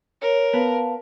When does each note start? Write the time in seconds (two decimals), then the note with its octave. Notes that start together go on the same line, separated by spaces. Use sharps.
0.22 A#4 C#5
0.53 B3 F5 A5